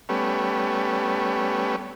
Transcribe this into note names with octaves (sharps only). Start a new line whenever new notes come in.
G3 A3 B3 C#4